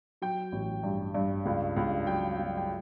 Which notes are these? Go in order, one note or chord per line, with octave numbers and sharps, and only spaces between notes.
F#3 G5
A1
G2
G2
C#2
C#2
F#3 G5
F#3
G5